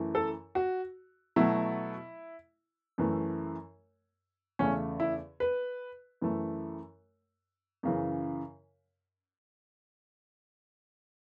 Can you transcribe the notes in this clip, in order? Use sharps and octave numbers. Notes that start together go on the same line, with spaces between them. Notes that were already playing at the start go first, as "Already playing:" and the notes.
Already playing: F#2 E3 A3
A4
F#4
B2 F#3 A3 E4
F#2 E3 A3
E2 C#3 A3 C#4
E4
B4
F#2 E3 A3
F#2 C#3 E3